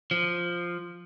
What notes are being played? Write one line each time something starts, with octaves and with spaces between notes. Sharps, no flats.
F3